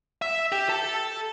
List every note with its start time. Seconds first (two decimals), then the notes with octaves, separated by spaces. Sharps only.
0.22 E5
0.52 G4
0.69 A4 A5